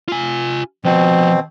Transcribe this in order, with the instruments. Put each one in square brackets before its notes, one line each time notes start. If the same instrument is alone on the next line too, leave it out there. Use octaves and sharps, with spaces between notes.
[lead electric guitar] F4 G#5
[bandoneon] B2 C4 [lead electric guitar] F3 F#4